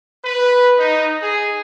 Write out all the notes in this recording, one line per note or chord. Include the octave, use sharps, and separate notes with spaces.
B4
D#4
G#4